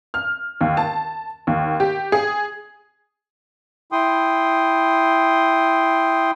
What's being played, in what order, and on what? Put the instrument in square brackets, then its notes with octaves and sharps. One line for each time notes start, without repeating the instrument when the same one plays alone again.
[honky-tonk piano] F6
D#2
A5
D#2
G4
G#4
[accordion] E4 G5 C6 D#6